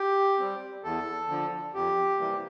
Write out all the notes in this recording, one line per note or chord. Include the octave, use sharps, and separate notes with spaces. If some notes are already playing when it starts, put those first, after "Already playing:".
Already playing: G4
G3 C4
E2 A4
D3 F3
F2 G4
C3 E3 G3 A#3